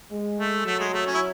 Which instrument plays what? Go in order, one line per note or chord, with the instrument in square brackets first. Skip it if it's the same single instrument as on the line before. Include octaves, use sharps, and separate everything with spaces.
[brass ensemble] G#3
[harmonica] A3
[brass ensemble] F#3 [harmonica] A3
[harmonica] G#3
A3
C#4
E4